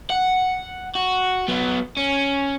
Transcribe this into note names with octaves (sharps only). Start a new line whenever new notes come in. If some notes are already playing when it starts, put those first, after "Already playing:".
F#5
F#4
F#3 B3
C#4